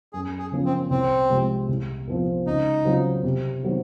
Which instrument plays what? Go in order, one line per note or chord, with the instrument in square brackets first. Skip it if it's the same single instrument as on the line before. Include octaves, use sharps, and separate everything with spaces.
[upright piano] F#2 [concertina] G#4
[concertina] G#4
[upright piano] C#3 F3 A#3 C#4
[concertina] C4
[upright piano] C2 [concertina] C4
[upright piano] C3 F3 G#3
C2
A#2 F3 C4
[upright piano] C#2 [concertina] D#4
[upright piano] C#3 F#3 C4 F4
C3
D#3 F#3 C4